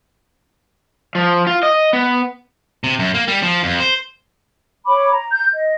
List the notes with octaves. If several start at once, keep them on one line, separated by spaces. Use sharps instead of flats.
F3
F4
D#5
B3
C3
F#2
A#3
G3
F3
F2
C5
C#5 B5 D6
A#5
G6
D#5